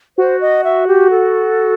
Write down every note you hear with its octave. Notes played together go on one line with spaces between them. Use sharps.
F#4 C5
D#5
E5
G4
A4